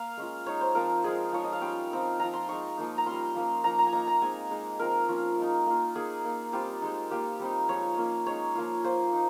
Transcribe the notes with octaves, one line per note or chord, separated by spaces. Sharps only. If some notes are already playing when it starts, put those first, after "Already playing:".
Already playing: A#3 F5
G#3 C#4 F4
G#3 D#4 C#5
C5
F3 C4 F4 A#4
G#3 C4 F4 G#4
F3 G#3 D#4 C#5
D#5
F5
G3 C#4 F4 G5
F3 C4 D#4
F3 C4 F4 A#5
C6
G#3 D#4 C#6
F3 A#3 D#4
A#5
G3 C#4 F4 C6
F3 A#3 C#4
F3 A#3 D#4 A#5
A#5
G#5
A#3 D#4 A#5
A#5
G#3 C4 D#4 G#5
G#3 D#4
F3 C4 F4 A#4
F3 A#3 C#4 F4
G#3 D#4
A#3 F4
A#3 D#4 G#4
A#3 D#4
G3 C4 F4 G4
G#3 D#4
A#3 F4 G4
G3 C4 D#4
F3 G#3 D#4 C#5
A#3 C#4 F4
G#3 D#4 C#5
F3 A#3 F4
A#3 F4 C5
D#4